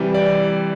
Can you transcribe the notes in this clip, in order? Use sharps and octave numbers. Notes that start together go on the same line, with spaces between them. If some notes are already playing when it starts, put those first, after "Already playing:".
Already playing: C3 E3 G3
D5